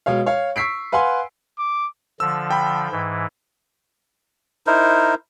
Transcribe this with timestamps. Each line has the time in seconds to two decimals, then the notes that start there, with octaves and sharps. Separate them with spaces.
0.06 B2 G#3 C#5 F5
0.26 C#5 F5
0.56 C#6 E6 B6 C7 D7
0.92 B4 F5 F#5 G#5 C6
1.58 D6
2.20 D3 F3 E6
2.51 G5 B5
2.91 G#2 E3
4.67 D#4 E4 A#4 C5